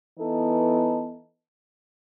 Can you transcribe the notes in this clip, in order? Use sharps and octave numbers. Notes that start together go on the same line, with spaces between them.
E3 B3 D#4 A4